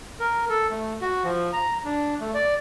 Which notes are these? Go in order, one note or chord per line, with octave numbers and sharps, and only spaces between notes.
A#4
A4
A3
F#4
F3
A#5
D4
A3
D5